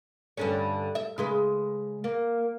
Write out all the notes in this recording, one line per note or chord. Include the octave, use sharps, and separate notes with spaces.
G2 D3 C#4
E5
C#3 G#3 B4
A#3